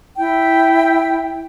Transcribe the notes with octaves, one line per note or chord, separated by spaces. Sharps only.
E4 G5